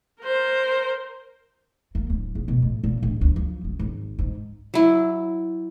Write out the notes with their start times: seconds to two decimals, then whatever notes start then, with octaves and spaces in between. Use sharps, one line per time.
0.21 A#4 C5
1.95 A#3
2.10 D1
2.35 G#2
2.48 B2
2.62 A2
2.84 A#2
3.03 D1
3.21 D2
3.36 F3
3.64 C#3
3.79 G#1
4.19 G#2
4.74 F#3 E4